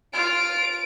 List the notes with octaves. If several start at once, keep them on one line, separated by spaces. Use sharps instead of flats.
F4 D7